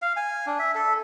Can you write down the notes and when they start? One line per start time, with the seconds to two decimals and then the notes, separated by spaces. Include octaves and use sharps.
0.02 F5
0.17 G#5
0.47 D4
0.59 E5
0.75 A4